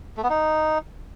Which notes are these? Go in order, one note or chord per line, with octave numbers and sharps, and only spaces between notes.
A3
B3
D#4